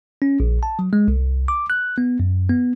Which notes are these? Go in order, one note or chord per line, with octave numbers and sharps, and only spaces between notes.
C#4
A#1
A5
F#3
G#3
C2
D6
F#6
B3
F#2
B3